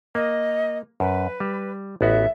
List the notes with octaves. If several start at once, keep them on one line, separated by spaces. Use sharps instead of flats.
A#3 D#5
F#2 B4
G3
A1 B3 F#4 E5